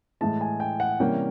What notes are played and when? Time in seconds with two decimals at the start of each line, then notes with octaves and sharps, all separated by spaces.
0.21 A2 E3 G#3 A5
0.41 G#5
0.60 G5
0.80 F#5
1.00 C3 E3 G3 A#3 C#4 G5